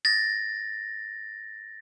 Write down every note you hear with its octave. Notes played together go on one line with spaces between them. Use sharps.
A6 A#6